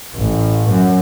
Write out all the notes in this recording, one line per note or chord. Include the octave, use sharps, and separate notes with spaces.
A1
F#2